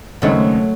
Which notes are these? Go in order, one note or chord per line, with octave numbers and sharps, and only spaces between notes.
D#2 C#3 F#3 G#3 A3 C4 D#4